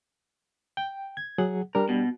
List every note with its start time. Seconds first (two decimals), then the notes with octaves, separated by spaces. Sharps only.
0.77 G5
1.17 G#6
1.38 F#3 G#4 F#5
1.75 G3 D4 A#4
1.89 B2